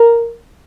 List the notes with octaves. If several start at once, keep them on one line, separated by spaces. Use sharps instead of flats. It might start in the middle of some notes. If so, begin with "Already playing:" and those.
Already playing: A#4